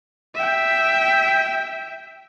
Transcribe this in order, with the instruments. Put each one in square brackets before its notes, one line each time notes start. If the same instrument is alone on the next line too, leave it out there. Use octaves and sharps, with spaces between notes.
[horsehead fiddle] E5 G5